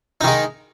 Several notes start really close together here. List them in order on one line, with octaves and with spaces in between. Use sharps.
D#4 D#3 G#3